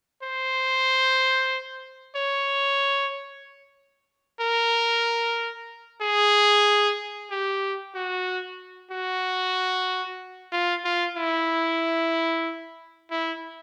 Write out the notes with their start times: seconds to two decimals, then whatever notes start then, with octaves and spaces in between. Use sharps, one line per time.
0.23 C5
2.16 C#5
4.41 A#4
6.02 G#4
7.31 G4
7.95 F#4
8.91 F#4
10.52 F4
10.84 F4
11.17 E4
13.11 E4